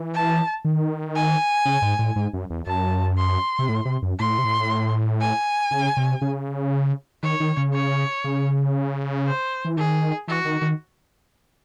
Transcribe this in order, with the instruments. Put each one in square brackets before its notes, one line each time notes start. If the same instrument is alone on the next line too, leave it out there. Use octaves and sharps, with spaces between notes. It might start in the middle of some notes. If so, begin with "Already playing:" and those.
Already playing: [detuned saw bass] E3
[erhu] A5
[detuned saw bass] D#3
[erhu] G#5
[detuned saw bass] C#3
G#2
A2
G#2
F#2
E2
[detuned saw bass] F#2 [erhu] A5
[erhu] C6
[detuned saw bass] C3
A2
C3
F#2
[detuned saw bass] A2 [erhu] C6
[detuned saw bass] C3
A2
[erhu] G#5
[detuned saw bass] C#3
C3
C#3
[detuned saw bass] D#3 [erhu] C#5
[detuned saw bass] D#3
C#3
[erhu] C#5
[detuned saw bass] C#3
[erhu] C5
[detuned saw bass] E3
[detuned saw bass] D#3 [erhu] G#4
[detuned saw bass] E3 [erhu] F#4
[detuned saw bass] D#3
D#3